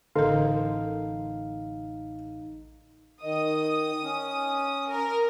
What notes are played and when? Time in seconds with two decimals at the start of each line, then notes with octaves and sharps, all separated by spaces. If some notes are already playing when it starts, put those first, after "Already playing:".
0.16 A1 D3 D#4 A4 A#4 F5
3.23 D#3 D#5 D#6
4.02 C#4
4.89 A#4